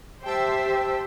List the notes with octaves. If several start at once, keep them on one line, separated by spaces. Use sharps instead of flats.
G4 C5 E5 G5 A5 E6